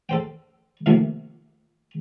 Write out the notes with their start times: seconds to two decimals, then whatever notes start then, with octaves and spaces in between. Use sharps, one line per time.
0.09 A4 C5 G5
0.86 C3 D#3 F3 A3 A#3